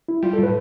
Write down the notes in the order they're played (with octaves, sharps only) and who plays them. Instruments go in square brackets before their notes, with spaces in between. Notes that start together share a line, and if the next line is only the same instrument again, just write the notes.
[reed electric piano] E4
[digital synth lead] G3 [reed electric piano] F4
[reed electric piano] A4
[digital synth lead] A2
[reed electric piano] B4